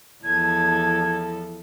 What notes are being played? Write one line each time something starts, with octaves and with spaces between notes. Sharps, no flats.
E2 F3 A4 G#6